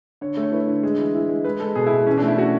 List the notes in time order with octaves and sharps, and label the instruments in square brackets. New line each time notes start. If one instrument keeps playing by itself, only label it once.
[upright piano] D3 [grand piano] C#5
[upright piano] A3
[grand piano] C#5
[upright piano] E4 [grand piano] B4
[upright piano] D3
G#3
E3
E4
G#3
[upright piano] G#3 [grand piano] B4
[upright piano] G#3 [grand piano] A4
[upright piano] B2 [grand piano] G#4
[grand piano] E4
[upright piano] B2
[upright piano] E3 [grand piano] C#4
[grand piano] D4
[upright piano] A3
[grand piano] E4
[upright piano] C#4 [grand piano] F#4